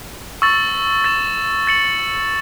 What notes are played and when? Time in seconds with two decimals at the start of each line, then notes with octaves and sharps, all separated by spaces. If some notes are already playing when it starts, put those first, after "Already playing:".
0.42 C#6 E6 A6 F#7
1.04 A6 E7
1.67 A6 C#7 F#7